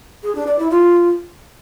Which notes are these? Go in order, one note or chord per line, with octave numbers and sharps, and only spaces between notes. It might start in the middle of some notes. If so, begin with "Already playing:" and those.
G#4
D4
D5
E4
F4